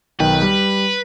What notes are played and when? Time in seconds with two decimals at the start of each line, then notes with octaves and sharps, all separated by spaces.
0.20 B1 D#3 B4 G5
0.42 G3